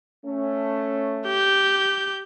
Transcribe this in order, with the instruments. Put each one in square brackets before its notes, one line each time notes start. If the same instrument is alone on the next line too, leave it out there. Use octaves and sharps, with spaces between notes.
[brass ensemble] A3 C#4
[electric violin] G4 G6